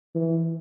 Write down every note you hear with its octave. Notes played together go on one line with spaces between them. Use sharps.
E3